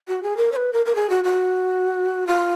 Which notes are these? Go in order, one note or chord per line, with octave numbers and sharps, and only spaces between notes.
F#4
G#4
A#4
C#5
B4
A#4
A#4
G#4
F#4
F#4
F4